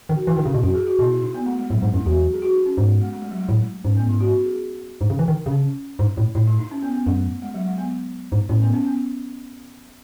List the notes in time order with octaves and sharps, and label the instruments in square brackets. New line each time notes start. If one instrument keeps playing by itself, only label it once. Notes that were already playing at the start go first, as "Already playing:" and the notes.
[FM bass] D#3
[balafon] F#4
[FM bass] E3 [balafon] E4
[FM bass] D#3
[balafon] D#4
[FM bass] C#3
[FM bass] B2 [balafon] E4
[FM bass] F#2 [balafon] F#4
[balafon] G#4
F#4
[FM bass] B2 [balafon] E4
[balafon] E4
D#4
B3
A3
G#3
[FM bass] A2 [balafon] F#3
[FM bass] G#2 [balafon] G#3
[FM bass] F#2 [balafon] E4
[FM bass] E2 [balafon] F#4
[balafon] G#4
F#4
D#4
C#4
[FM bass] G#2 [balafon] B3
[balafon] G#3
G#3
A3
G#3
F#3
G#3
[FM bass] A2 [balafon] A3
[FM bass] G#2 [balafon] C#4
[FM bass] A2 [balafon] B3
[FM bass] G#2 [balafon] E4
[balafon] F#4
G#4
[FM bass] G#2
C#3
E3
D#3
C#3
[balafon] C#4
[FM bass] G#2 [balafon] D#4
[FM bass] A2
[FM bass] A2 [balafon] D#4
[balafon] E4
D#4
C#4
B3
B3
[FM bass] F#2 [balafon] A3
[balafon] G#3
F#3
G#3
B3
[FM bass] G#2
[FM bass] A2 [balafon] C#4
[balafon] B3
C#4
B3